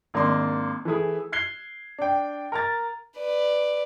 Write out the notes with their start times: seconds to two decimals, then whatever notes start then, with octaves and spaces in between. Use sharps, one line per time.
0.14 G#1 A#3 D4 C6
0.85 E3 A3 E4 G#4
1.32 F#6 G#6 C7 G7
1.98 D4 G5
2.52 A#4 A#5 A6
3.17 B4 D5